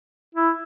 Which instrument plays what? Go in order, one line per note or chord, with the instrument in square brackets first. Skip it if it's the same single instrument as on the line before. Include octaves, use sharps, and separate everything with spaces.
[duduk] E4